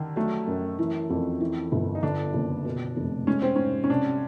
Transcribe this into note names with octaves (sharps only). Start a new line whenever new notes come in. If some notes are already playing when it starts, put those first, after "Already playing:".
Already playing: D3 D#3
F#3 A3
F#2
E3
F2
E3
G1
D#4
D3 D4
F#1
B2
F1
G#3 C#4
C4
G#2 C#4
C#4
C3 D4